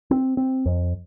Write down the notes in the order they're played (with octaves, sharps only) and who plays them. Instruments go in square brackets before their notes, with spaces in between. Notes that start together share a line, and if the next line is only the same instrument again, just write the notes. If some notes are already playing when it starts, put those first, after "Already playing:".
[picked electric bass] C4
C4
F2